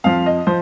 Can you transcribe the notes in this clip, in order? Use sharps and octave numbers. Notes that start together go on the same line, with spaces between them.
F2 F3 F5
D#5
F3 C5